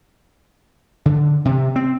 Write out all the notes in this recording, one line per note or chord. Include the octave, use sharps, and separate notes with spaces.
D3
C3
C4